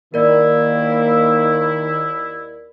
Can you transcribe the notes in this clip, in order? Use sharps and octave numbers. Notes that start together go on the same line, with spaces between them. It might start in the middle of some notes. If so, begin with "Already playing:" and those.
D#2 D#3 A#3 E4 A#4 D5